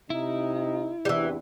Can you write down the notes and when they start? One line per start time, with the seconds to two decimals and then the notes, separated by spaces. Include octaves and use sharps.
0.10 C3 D#4 E4
1.05 E2 C3 E3 G3 D4